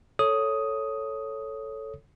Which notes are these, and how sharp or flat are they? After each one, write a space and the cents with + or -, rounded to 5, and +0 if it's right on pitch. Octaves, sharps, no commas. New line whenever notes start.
A4 +0 C#5 +0 D#6 +5